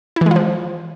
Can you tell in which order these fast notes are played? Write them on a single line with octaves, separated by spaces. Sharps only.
E4 E3 G#3 F4 F3